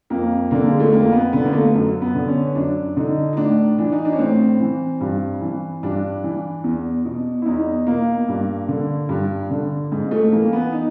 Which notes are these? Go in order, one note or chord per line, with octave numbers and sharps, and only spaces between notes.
F2 A#3
D3 A#3
G#3
A3
F2 A#3
B3
D3 B3
A#3
A3
F#2
B3
D3
C#4
F#2 D4
D3 D#4
D#4
A2 D4
E3 D4
D#4
D4
C#4
A2 C4
E3
G2
E3
G2 D4
E3
E2
B2
E4
E2 D#4
B2 A#3
G2
D3
G2
D3
G#2
A3
E3 A#3
B3
D#4